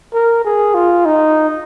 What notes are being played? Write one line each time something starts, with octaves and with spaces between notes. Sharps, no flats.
A#4
G#4
F4
D#4